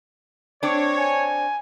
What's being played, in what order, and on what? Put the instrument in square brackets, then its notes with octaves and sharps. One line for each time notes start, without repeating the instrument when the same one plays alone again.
[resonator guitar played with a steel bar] C4 D4 [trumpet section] C#5
[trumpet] G#5